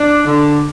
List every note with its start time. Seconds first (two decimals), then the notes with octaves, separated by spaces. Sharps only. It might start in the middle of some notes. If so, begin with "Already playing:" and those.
Already playing: D4
0.26 D3